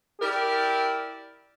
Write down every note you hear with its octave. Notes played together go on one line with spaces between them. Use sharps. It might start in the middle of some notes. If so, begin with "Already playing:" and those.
E4 G4 A#4 D5